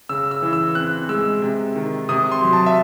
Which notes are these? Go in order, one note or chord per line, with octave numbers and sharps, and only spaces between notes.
C#3 E6
E6
E3
E6
C4 F#6
G#3 E6
C3
D#3
C3 D#6
C6
F#3
A5
E5